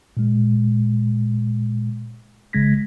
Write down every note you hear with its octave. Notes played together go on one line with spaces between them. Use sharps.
A#2 G#3
G1 C#3 G#3 G#6 A#6 B6